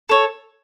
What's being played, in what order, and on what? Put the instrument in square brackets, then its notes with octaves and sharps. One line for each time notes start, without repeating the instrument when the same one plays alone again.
[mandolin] A4 C#5